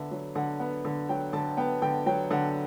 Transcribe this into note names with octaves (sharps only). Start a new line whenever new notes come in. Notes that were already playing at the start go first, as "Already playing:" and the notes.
Already playing: D3 B3 E5
F#3
D3 F#5
B3
D3
F#3 G5
D3 A5
B3 G5
D3 G5
F#3 G5
D3 F#5